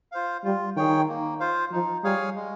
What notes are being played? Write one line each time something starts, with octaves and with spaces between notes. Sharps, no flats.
F4 C5 F5
G3 F4
D#3 G#4 C#5 G5
A#3
F4 C5 F5
F3 D#4
G3 G#4 C#5 F5 G#5
G#3